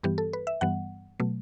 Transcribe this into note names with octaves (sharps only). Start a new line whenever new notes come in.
G2 E3 G3 B3 G4
A4
B4
E5
G2 E3 G3 B3 F#5
B2 F#3 A3